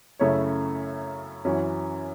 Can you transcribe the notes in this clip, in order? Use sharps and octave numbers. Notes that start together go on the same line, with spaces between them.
F#2 C#3 A3 E4 C#5
F#2 E3 C#4 F#4